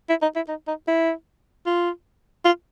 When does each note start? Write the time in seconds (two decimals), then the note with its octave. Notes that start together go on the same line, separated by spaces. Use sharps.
0.09 E4
0.22 D#4
0.36 E4
0.48 D#4
0.67 D#4
0.88 E4
1.66 F4
2.45 F4